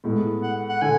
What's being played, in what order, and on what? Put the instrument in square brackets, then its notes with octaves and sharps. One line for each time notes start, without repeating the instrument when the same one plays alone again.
[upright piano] A2 G#3 B3
[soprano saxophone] F#5
F#5
[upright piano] D3 [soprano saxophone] G#5